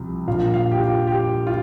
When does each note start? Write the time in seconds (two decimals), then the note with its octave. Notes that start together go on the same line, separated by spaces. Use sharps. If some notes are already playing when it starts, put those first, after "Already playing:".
Already playing: C2 C3 F3
0.27 A#1 A#2 F3 F5
0.54 F5
0.71 G4
0.80 F4
1.07 G4
1.47 F4